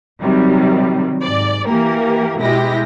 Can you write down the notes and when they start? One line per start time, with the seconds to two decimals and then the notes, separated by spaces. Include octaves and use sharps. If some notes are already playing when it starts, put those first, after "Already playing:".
0.21 C3 D#3 F#3 G3
1.24 G#2 D5
1.66 E3 A#3 G4 A#4
2.39 B2 G#3 E4 G4 A#6